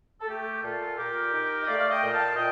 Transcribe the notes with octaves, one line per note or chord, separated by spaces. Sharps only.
A4
A3 G4
A#2 F4 A4
A#2 G4 A#4
D#4
D#5
A3 D5 F5
F5
D#5 G5
A#2
F5 A5
A#2 D#5 G5